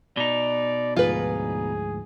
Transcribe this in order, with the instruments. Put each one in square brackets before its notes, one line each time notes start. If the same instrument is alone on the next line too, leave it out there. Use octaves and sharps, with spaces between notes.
[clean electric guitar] B2 D#4 [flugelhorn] D5
[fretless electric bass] D2 G#2 F3 [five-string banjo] F4 B4 [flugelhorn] G#4